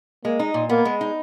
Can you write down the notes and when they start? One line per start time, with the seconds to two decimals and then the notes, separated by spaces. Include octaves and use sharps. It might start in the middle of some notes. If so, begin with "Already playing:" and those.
0.25 G#3 A#3
0.39 D#4
0.54 A#2
0.69 A#3 B3
0.85 G#3
1.01 D#4